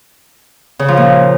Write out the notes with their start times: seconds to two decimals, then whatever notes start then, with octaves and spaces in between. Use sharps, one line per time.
0.79 C#3
0.88 F3
0.97 A#2